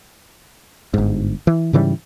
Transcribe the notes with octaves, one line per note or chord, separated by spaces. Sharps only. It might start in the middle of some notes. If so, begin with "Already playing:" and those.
G1 G#2
E3
G#2 C#3 E3 G3